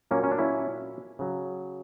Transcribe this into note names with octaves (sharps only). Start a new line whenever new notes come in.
A#2 F#3 A#3 C#4
C#4
D4
C#4 E4
C#3 F#3